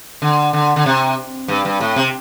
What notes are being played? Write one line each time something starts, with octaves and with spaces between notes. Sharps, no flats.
D3
D3
D3
C3
G2
G2
A2
C3